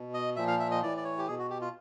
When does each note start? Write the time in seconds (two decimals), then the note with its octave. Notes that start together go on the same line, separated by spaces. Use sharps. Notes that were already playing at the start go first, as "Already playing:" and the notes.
Already playing: B2
0.14 D#5
0.36 A#2 F3 E5
0.47 F5
0.60 E5
0.71 D#5
0.83 A2 E3 D5
0.97 D5
1.05 C#5
1.18 G4
1.27 B2 G#4
1.39 F#4
1.50 G4
1.61 F4